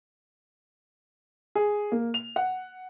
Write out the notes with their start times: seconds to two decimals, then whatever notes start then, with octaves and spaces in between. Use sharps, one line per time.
1.55 G#4
1.92 A#3
2.14 F7
2.36 F#5